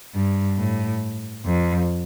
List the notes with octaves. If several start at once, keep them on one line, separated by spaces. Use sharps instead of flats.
G2
A2
F2